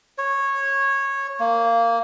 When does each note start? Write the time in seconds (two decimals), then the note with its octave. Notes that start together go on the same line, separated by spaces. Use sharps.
0.18 C#5
1.40 A#3